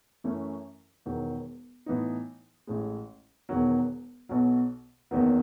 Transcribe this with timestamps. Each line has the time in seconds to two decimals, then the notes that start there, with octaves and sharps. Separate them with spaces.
0.24 F#2 E3 A3 C#4
1.06 E1 E2 D#3 F#3
1.86 A2 E3 B3 D#4
2.67 A1 A2 G#3
3.49 E1 E2 D#3 F#3
4.29 B1 B2 F#3
5.11 F#1 E2 D#3 F#3 B3